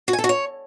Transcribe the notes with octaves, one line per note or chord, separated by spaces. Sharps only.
F#4
G#5
A4
F#4
C#5